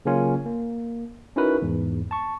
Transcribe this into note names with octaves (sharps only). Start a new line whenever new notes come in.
C#3 F#3 A#3 C#4 F4 G#5
A#3
C#4 D#4 E4 F#4 A#4 B4
E2 G#2
A5 C#6